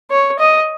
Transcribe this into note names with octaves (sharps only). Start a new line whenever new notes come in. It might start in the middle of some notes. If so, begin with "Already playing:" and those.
C#5
D#5